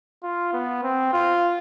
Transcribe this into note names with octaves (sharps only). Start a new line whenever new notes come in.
F4
B3
C4
F4